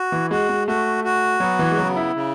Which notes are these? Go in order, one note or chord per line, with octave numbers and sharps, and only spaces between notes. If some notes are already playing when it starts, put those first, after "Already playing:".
Already playing: F#4
E3
G#3 F#4
G#3
A3 F#4
F#4
F#3 B3
E3
G#3
C#3 F#3
E4
C#3